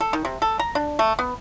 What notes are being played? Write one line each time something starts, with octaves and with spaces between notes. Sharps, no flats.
A4
D#3
C3
A4
A#5
D4
A3
B3